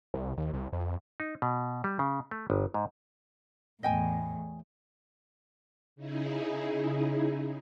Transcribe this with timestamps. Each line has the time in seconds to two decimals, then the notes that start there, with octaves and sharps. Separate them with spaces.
0.14 C2
0.37 D#2
0.53 C2
0.72 F2
1.20 D#4
1.42 B2
1.84 G3
1.99 C#3
2.31 A3
2.50 G1
2.74 G#2
3.83 E2 A2 D#5 G5 G#5
5.96 C#3 D#4 E4 G#4